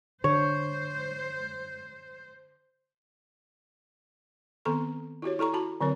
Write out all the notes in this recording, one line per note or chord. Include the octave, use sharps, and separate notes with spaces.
D3 C5 C#5
D#3 B3 C4 A4 A#5 C#6
E4 F#4 G4 C#5
E4 A4 A#5 C#6
F#4 A5 B5
D3 F#3 C4 A#4 C#5